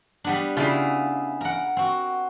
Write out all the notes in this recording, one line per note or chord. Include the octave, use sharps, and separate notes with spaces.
G3 B3 D4
C#3 E4 F4 G#4
A#4 F#5
C4 F#4